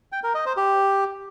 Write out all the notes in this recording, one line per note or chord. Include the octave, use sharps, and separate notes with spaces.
G5
A#4
D#5
C5
G4